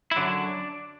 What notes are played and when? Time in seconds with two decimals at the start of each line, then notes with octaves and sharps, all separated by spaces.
0.11 E4
0.16 F#2 D3 F#3 D4